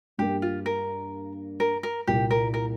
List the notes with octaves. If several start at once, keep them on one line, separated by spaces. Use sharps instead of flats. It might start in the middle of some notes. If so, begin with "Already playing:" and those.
G2 G3 A#3 G4
F4
A#4
A#4
A#4
C2 A#2 A#3 F4 G4
A#4
A#4